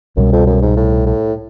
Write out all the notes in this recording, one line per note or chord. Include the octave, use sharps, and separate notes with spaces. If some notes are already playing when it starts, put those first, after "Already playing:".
C2 F#2 B2 G3
F2
F#2
G#2
A2
A2